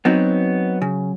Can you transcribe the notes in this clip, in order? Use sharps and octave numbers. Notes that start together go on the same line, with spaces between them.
F#3 B3 C4 D#4
C#3